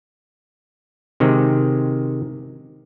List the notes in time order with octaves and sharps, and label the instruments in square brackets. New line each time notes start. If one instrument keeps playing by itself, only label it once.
[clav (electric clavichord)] C3 D#3 G#3 C4